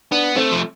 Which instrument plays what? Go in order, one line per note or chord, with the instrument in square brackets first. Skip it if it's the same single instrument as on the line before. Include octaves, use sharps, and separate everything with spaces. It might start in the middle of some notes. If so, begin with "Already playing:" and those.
[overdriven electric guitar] B3 [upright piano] D4
[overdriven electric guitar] A3 [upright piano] C4
[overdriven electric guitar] F3